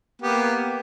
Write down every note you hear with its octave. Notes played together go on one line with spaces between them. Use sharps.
A#3 B3 G4